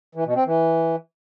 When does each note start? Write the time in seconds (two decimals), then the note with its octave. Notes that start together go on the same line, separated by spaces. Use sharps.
0.15 E3
0.25 B2
0.36 C4
0.46 E3